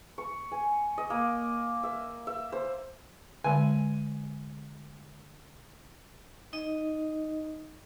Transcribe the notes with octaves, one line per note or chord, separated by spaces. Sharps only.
C#6
G#5
D#5
A#3
E5
E5
C5
D3 G#3 D5 G#5
D#4 D#5